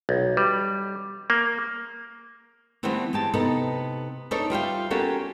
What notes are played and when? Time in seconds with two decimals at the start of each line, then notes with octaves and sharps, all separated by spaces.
0.09 B1
0.37 G3
1.30 A#3
2.83 D3 E3 G3 A3 B3 C4
3.13 G#3 G4 A5
3.34 C3 B3 D#4 A4
4.31 D4 D#4 A4 B4 C#5
4.50 G3 F4 E5 G5
4.91 A#3 C#4 F#4 G4 A4